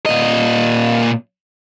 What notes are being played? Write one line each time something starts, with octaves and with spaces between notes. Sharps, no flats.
A#2 D#5